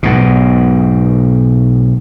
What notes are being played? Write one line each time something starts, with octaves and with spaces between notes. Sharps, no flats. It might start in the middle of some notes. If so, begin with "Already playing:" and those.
B1 G#2 B2